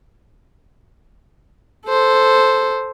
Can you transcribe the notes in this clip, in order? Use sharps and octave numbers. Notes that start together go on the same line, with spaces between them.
A4 C5